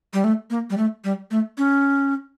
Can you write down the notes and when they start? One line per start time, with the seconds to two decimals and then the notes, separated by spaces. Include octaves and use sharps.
0.13 G3
0.24 A3
0.50 A#3
0.70 G3
0.78 A3
1.04 G3
1.31 A3
1.58 C#4